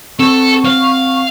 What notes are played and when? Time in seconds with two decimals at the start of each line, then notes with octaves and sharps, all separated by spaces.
0.20 C4 A4 C#6
0.65 F5